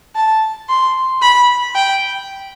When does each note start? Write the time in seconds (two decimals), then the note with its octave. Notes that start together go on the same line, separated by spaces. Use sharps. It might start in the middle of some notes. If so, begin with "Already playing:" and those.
0.16 A5
0.69 C6
1.22 B5
1.75 G5